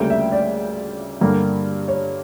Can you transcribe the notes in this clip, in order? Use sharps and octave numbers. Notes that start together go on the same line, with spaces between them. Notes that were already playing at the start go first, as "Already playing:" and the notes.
Already playing: D2 C#3 G3 A#3 G5
E5
D5
G2 D3 G3 A#3
C#5